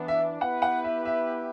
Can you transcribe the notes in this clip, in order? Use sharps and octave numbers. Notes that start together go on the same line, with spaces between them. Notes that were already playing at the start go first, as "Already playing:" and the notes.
Already playing: E3 B3 D4
E5
B3 E4 G4 B4 F#5
F#5
E5
E5